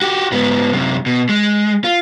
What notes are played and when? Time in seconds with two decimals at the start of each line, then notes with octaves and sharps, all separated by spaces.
0.02 F#4 G4
0.32 G#2 B3
0.73 F#2 C3
1.06 B2
1.29 G#3
1.84 F4